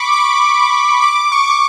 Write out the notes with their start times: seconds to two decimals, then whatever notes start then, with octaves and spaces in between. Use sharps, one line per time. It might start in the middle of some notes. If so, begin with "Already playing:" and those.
Already playing: B5 C#6 D6
0.12 D6
1.02 D6
1.32 C#6